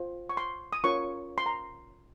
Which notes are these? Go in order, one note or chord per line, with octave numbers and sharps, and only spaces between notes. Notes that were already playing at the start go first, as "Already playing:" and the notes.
Already playing: F4 C5
C#6
C6
D#6
C#4 F4 A#4 C#5 C#6
C6
A#5